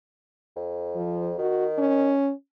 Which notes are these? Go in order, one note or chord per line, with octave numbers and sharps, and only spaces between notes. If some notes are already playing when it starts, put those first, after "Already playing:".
F2
F3
D#3 F#4
C#4